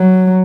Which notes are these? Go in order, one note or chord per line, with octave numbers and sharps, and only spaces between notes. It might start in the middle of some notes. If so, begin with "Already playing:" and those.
Already playing: F#3